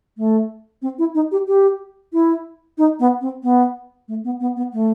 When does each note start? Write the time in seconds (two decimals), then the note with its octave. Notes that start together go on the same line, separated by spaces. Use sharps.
0.17 A3
0.82 C4
0.98 E4
1.15 D#4
1.32 G4
1.48 G4
2.13 E4
2.78 D#4
3.00 B3
3.21 C4
3.43 B3
4.08 A3
4.24 B3
4.40 B3
4.56 B3
4.73 A3